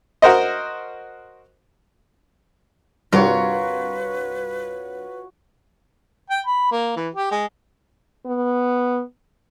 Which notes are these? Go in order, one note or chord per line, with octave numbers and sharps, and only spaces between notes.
F#4 A#4 C5 D#5
C2 G2 F4 F#4 A#4 B4 C#5
G5
B5
A#3
E3
G4
G#3
B3